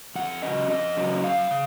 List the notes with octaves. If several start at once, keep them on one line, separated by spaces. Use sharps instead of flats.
F2 F#5
C#3 F#3 C#4 D#5
F2 D#5
C#3 F#3 C#4
F#2 F5
C#3